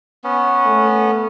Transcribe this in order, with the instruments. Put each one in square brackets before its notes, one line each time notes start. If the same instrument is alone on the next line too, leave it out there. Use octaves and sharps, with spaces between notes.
[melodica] B3 C#4
[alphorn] A3